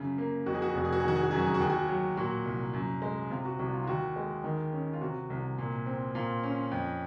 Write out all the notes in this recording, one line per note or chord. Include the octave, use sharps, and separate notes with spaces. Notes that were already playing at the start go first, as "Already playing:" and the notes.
Already playing: F#2 C#3
A#3
F2 F#4
G#4
F#4
G#4
F1 F#4
G#4
F#4
G#4
D#3 F#4
G#4
F#4
F#2 G#4
F#4
G#4
F#4
D#2 G#4
F#4
F#3
A#2 F#4
C2
F#2
G#3
C3 F4
F#4
C2 F#4
F4
F4
D#2 F#4
G#3
D#3
C#4
F4
C3 F#4
C2
A#2
C4
A#2 F4
C#4
F2